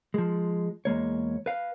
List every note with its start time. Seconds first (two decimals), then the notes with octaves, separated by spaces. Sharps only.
0.14 F3 G#3
0.85 E2 G#3 A#3 C#5
1.46 B4 F5